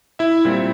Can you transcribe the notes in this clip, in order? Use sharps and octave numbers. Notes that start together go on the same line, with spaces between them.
E4 E5
A#2 G3 C4 E4